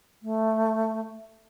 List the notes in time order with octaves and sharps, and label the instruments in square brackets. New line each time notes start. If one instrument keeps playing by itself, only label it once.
[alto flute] A3